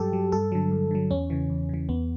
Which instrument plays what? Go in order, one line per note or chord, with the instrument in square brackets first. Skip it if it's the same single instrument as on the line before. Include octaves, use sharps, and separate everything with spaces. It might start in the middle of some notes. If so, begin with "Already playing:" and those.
Already playing: [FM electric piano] G2 F#3 G4 A4
F#3
G2 A4
D3 F#3
G2
D3 F#3
E2 C#4
C#3 E3
E2
C#3 E3
E2 B3